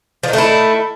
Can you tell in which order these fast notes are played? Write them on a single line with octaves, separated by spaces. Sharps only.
F3 D#3 A3 E4